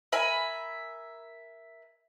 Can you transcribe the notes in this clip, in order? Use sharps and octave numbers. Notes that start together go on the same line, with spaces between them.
A#4 E5 G#5 B5